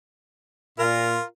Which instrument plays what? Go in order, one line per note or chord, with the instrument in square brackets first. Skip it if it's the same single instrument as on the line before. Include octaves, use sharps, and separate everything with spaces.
[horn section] A#2 [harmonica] F4 A#4